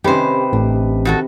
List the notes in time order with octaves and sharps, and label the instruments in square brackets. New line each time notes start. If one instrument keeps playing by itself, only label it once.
[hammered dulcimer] C3 B4 D#5 [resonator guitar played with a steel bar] D#3 C5 [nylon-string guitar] C#4 G4
[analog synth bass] A1 [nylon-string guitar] D4
[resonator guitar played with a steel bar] D#3 F#4 A4